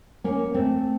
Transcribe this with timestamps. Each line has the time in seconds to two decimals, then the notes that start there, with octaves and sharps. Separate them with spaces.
0.24 A#3 C#4
0.54 A3 C4